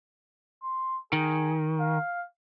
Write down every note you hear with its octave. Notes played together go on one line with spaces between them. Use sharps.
C6
D#3 G#4
F5